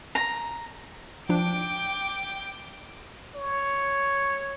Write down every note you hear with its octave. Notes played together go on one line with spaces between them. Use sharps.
A#5
F3 D4 G5 D6
C#5